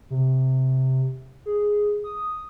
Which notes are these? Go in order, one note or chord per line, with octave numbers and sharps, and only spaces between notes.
C3
G#4
D#6